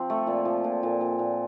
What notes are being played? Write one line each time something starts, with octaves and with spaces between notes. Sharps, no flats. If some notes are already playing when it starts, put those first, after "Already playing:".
Already playing: F3 C4
A3
A#2
F3
A#2
A#2
A#2
A#2